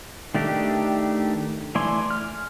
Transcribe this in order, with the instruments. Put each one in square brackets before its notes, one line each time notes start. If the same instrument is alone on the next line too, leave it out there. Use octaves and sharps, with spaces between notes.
[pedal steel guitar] D#3 A3 D4 G4
E3 A3 D5 G#5 C6
F6